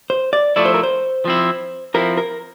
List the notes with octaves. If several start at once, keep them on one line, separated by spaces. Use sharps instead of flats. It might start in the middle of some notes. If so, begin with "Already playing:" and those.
C5
D5
F3 A3 E4 D5
C5
A#4
C5
F3 C4 E4
F3 C4 E4 A#4
A#4